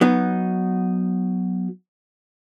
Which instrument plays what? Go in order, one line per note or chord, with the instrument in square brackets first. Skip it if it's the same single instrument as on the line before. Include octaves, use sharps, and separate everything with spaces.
[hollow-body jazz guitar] F#3 B3 D#4